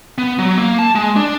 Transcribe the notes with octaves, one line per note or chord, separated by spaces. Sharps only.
B3
F#3
A#3
A5
G#3
D4